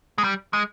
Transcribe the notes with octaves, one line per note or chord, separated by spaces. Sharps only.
G#3
G3
G#3